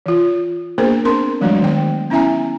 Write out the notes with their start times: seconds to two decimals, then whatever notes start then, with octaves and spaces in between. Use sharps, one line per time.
0.06 E3 F4
0.78 A#3 B3 D4 G#4 A#4 C5
1.05 C4 D4 A#4 C6
1.41 E3 F#3 G#3 A3 D4 F#4
1.60 D#3 B3 G5
2.10 B3 C#4 E4 E5 G#5 A#5